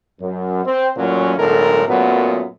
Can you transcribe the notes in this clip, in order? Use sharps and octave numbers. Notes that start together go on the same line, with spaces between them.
F#2
C4
A1 F#2 A#2 F#3 C#4
B1 A2 D3 G#3 A4 A#4
F#2 A#2 F#3 A3 B3